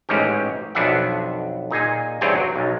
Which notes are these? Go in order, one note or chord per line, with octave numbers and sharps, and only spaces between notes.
A1 G#2 G#3 C#4 G4
B1 F2 B3 D4 E5 F#5
A#2 D#4 G#4 G#5
E2 G2 C4 G#4 C#5 G5
F#3
B1